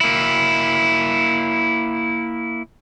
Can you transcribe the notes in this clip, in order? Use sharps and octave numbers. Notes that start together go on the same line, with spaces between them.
A#3 E4